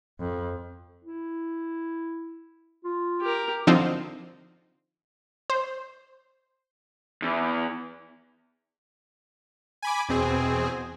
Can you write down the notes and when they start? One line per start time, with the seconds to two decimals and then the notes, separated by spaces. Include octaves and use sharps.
0.20 F2
1.05 E4
2.84 F4
3.21 G4 A#4
3.67 D3 F3 C4 D#4 F4
5.50 C5
7.22 E2
9.82 G#5 B5 D6
10.09 E2 B2 C4 G#4